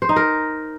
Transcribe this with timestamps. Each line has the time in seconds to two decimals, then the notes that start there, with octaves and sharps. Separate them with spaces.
0.02 C5
0.09 D#4
0.16 A#4